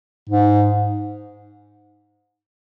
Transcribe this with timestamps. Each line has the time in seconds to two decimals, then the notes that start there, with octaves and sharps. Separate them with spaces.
0.29 G#2